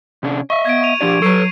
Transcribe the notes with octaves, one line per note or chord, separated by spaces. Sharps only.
C3 C#4 D4
D#5 E5 C#6
B3 G#6 D7
C#6 D#7 F7
F3 D4 G4 D5
F#3 A4 B4 C#6 C7 D7